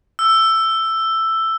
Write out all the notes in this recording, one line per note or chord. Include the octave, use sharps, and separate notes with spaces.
E6